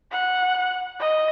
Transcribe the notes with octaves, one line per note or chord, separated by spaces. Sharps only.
F#5
D#5